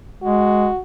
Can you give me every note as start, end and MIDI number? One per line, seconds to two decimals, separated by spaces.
0.23 0.69 56
0.23 0.80 66